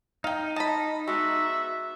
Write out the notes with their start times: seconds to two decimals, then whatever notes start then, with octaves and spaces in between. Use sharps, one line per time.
0.24 D#4 F5 G5
0.56 D#5 A5 B5
1.08 G#3 B3 F#4 E5